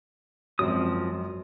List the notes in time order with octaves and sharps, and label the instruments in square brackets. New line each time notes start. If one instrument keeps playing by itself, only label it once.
[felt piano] G#1 F#2 [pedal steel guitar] F3 C4 D#6